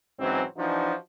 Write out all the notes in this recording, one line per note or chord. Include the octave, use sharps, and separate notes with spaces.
G#2 E3 F#3 C4 C#4
E3 F3 D4 D#4 F#4